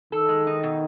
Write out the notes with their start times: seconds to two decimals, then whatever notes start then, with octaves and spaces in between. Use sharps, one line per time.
0.12 D#3 A4
0.29 G#3
0.47 D#4
0.63 B2